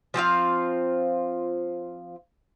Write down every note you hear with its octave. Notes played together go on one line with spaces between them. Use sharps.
F3 C4 F4 F5